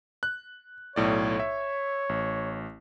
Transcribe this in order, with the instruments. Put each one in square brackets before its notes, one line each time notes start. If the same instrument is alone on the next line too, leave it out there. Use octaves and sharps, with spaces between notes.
[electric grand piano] F#6
[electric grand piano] B1 A2 D5 [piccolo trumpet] C#5
[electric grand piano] E5
A1